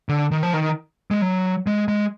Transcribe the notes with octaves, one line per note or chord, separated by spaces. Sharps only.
D3
D#3
F3
D#3
G#3
F#3
G#3
G#3